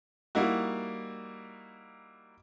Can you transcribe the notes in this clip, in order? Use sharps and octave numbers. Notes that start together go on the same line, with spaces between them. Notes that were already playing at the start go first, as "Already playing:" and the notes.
G3 A#3 D#4 E4 F#4